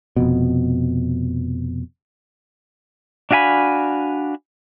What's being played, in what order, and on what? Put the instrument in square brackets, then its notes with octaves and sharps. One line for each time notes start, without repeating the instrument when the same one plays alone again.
[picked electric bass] F1 F2 B2
[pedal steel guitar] D4 F#4 F5 G#5 B5